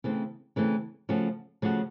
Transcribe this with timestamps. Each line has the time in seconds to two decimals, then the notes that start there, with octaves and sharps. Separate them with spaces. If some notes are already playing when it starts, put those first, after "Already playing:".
0.04 C#3 E3 A3 C4
0.56 C#3 E3 A3 C4
1.09 C#3 F3 A3 C#4 F#4
1.62 C#3 F3 A3 C#4 F#4